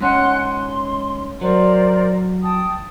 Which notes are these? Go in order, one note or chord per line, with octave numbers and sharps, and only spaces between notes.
G#2 C#4 F#5 C6 F#6
C6
F#3 A#4 C5 D5
G5 A5 D#6